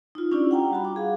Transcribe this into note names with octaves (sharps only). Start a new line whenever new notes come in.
D#4 F4
C#4 D4 E4 F4 G4 D5
F#5 G5 A#5
G3 F#4 B5
F#5 D6
G#4 F5